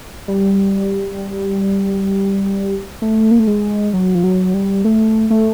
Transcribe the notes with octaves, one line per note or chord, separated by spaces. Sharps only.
G3
A3
A#3
A3
G#3
F#3
F3
F#3
G3
A3
A3